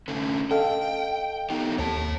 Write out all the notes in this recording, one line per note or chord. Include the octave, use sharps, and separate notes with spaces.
D3 A3 C#4
A4 D#5 F5 G5
B3 D#4 G4
D#2 C#5 A5